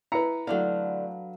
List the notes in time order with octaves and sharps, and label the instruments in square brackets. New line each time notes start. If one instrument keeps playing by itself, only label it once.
[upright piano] E4 C#7 [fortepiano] B4 A#5
[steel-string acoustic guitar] D3 [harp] F#3 D4 F5 [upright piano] A3 E4